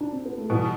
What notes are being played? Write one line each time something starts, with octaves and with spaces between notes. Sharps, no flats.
D4
C4
B3
A3
B2 E3 G3